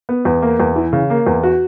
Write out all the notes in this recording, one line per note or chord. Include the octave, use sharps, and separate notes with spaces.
B3
E2
A#3
E2
E3
C#3
A#3
E2
F#4